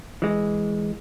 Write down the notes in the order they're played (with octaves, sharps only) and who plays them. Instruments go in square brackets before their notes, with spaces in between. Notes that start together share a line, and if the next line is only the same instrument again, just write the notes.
[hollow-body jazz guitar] E3 G#3